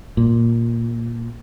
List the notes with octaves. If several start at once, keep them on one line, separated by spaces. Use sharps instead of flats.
A#2